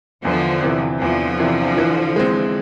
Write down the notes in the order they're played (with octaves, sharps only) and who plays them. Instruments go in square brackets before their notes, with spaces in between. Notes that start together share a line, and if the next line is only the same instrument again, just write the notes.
[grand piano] E2 [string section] D3 F3
[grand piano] C3 E3
[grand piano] E2 [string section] D3 F3
[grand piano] C3 E3
E3
G#3 C4